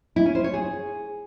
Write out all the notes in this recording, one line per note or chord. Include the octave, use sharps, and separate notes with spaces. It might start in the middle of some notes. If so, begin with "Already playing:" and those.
E4
C#4
C5
C#5
G#4